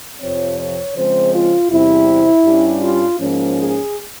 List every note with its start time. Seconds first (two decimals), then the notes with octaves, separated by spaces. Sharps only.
0.21 F2 C3 F3 C4 C#5
0.59 C#5
0.96 C#3 F3 G#3 C4 C5
1.34 F4
1.71 E2 C3 G3 C4 E4
2.45 G2 G3 C#4
2.83 F4
3.20 G#2 F3 A#3 C#4
3.57 G#4